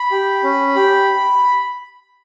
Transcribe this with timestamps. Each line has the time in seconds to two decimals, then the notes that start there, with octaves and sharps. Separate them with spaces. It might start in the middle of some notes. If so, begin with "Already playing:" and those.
Already playing: B5
0.11 G4
0.44 C#4
0.76 G4